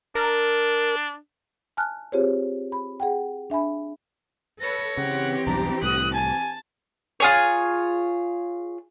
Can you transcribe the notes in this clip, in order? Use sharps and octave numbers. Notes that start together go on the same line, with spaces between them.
D4 A#4
G#5 A5 F6 F#6
C4 F4 G4 G#4 C5 C#5
B5
G#4 F#5 G5
D4 E5 G#5 B5
A4 B4 C#5 A#6
C#3 E3 C4 G4 F#5
B1 E2 G2 D4 A#5
C2 A2 D#6 F#6
G#5 A5
F4 G#4 C#5